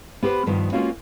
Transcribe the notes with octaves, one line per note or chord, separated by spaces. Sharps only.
B3 G4 B4 C5
G2 D#3 F3 B3
G#3 A#3 B3 C#4 F4 F#4